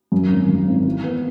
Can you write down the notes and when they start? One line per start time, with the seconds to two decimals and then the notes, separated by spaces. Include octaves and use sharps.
0.12 F#2
0.30 G#1
0.49 F#2
0.67 G#1
0.85 E3
1.04 B3